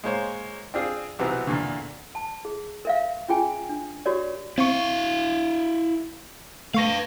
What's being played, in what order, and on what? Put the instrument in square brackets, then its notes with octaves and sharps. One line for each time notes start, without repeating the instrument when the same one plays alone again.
[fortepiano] G#3 A#3 C5 C#5
C4 D4 F4 G#4
B1 C3 E3 F#3 B3
E2 A#2 D3
[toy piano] A5
G#4
A#4 E5 F5
C#4 F4 G#4 G5 G#5
D4
F#4 G4 A#4 C#5 D5
[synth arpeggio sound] C4 C#6 [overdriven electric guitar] E4 F5
[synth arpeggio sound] A3 C#6 A#6 [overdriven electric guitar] B4 F5